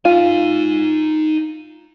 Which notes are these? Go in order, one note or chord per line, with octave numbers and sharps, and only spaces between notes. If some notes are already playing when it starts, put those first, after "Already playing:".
D#4 F4 G#5